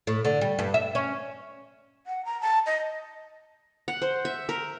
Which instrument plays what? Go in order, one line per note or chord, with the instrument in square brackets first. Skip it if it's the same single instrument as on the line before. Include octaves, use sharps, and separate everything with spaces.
[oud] A2
D3
G3
G2
E5
C#4
[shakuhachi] F#5
A#5
A5
D#5
[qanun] F#5
C5
E5
A#4